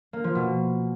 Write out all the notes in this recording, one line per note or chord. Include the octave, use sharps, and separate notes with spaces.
A#3
F3
B2